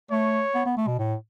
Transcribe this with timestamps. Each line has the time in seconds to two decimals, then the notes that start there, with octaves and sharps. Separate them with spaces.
0.11 A3 C#5
0.54 B3
0.66 B3
0.77 A3
0.87 B2
0.99 A2